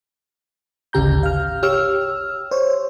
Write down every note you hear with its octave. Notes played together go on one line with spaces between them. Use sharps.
G#1 D2 C#3 G4 A#5 G6
F5 F6
G4 C#5 E6 F6
C5 C#5